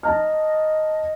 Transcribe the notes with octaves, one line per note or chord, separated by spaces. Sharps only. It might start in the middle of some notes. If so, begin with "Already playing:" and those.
D#5 A5 A#5 F6